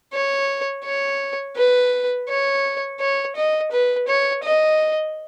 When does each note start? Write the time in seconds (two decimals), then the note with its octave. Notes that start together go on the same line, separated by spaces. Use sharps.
0.13 C#5
0.84 C#5
1.56 B4
2.29 C#5
3.00 C#5
3.36 D#5
3.72 B4
4.08 C#5
4.44 D#5